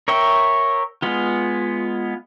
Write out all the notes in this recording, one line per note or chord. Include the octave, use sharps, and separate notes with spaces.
A#4 C#5 E5 G5
G#3 B3 F4